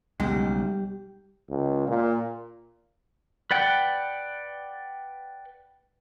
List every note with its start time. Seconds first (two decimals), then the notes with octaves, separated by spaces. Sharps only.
0.20 B1 C#3 G3 G#3 G4
1.49 C#2
1.87 A#2
3.51 B4 D5 F#5 G5